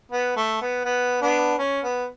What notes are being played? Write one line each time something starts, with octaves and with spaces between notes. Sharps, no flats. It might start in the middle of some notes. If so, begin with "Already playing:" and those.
B3
A3
B3
B3
B3 D4
C#4
B3